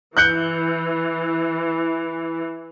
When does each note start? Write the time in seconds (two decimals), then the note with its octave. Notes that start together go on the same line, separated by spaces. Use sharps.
0.17 E3 F#6 G6 C#7